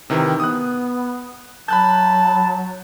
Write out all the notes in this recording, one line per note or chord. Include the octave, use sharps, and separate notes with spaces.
C3 D#3 E3 D#4
B3 D#6 F#6
F#3 A5 B5 F#6 G6